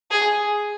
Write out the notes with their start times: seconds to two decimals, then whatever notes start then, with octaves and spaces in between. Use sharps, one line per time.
0.11 G#4